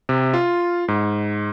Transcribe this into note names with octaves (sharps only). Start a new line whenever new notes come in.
C3
F4
G#2